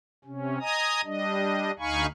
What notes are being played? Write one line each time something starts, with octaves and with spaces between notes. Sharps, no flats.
C3 C#4
D#5 G#5 A#5 D#6
G3 D4 D#5
D2 D#4 F5 G#5 B5 C#6